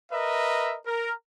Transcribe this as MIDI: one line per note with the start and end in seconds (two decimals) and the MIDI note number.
0.12 0.77 70
0.12 0.77 71
0.12 0.77 75
0.12 0.77 76
0.86 1.12 70